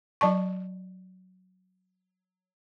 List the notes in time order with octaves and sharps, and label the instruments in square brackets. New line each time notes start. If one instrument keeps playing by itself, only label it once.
[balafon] F#3 D5 A5 C#6